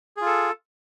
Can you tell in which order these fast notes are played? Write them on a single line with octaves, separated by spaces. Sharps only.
G#4 F4 A4